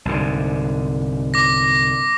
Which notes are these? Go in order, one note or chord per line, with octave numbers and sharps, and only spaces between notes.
C2 G#2 D3
D6 A#6